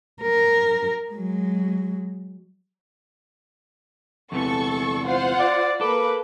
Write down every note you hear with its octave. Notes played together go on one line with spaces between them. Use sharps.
A#4
F#3 G#3
E2 C3 E3 A4 C#6
F4 C5 F#5
D5
A#3 A4 B4 D6